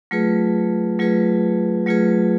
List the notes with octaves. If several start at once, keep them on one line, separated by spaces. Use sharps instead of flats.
F#3 A3 F4 G#4 B4
F#3 A3 F4 G#4 B4
F#3 A3 F4 G#4 B4